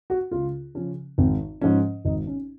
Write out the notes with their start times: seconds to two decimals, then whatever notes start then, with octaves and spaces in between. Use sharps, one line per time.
0.10 F#4
0.31 C#2 F4
0.75 C#3 F3 C#4
1.18 G#1 C4
1.61 G#2 F3 C#4
2.05 G#1 D#4
2.27 C#4